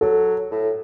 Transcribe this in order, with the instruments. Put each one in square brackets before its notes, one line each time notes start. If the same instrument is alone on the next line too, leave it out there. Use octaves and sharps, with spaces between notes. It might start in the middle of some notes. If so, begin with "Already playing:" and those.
[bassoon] F#3 [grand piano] A4
[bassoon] A2